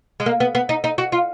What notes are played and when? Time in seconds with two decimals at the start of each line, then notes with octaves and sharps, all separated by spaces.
0.20 G#3
0.26 A#3
0.40 B3
0.55 B3
0.69 D#4
0.84 D#4
0.98 F#4
1.12 F4